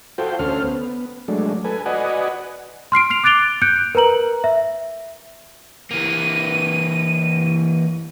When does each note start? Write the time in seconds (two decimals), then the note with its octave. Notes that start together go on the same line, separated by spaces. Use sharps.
0.18 F4 F#4 A4 C5 G5
0.39 D2 C#4 A4 C5 F6
0.64 B3
1.28 F#3 G#3 A3 D4
1.64 A4 B4 G#5
1.86 F#4 B4 D5 D#5 F#5 G#5
2.92 C6 F6 C7 D7
3.10 F6 C7 F7
3.24 D6 F#6 A6 D7 F7 G7
3.62 F#6 G6 C#7 D7
3.95 A#4 B4 A#5 F#7
4.44 E5
5.91 E3 A#3 D#7